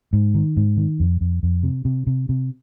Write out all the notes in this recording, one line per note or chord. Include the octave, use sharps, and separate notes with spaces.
G#2
D#3
G#2
D#3
F2
F2
F2
C3
C3
C3
C3